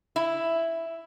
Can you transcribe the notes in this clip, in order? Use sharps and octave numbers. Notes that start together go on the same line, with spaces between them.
E4